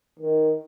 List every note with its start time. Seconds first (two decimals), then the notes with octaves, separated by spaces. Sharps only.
0.19 D#3